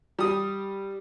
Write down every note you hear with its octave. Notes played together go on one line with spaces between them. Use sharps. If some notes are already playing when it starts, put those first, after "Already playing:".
G3 D#6